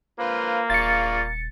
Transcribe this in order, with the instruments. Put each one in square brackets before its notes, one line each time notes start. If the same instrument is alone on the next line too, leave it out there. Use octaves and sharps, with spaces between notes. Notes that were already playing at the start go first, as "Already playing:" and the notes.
[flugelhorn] A#3 [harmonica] F4 B4 C5
[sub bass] D#1 [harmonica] F4 D5 C#6 [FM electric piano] A6 C#7